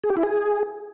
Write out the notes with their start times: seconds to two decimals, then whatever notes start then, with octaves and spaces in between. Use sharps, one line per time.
0.04 G#4
0.10 G4
0.17 E4
0.23 G#4